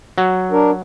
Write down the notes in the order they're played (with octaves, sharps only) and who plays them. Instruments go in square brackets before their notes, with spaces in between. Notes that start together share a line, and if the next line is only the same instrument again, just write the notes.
[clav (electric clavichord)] F#3
[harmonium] D4 A#4